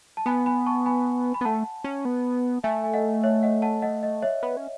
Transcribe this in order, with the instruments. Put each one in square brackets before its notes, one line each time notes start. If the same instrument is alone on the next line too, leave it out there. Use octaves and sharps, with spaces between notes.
[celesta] A5
[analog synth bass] B3 [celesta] G#5 B5
[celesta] G#5 B5
A5 C#6
G#5 B5
B5
[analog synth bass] B3
[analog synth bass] A3 [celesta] F#5 A5
[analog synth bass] C#4
B3
[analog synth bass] A3 [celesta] E5 G#5
[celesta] G#5
D#5 F#5
C#5 E5
D#5 F#5
F#5 A5
D#5 F#5
D#5
C#5 E5
[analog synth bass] B3
C#4